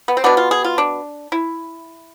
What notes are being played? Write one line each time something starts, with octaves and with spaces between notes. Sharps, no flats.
B3
C4
B2 B3 D4
F4
G#4
F4
D4
E4